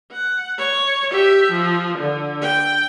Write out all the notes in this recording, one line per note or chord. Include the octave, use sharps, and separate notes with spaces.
F#5
C#5
G4 E5
F3
D3
G5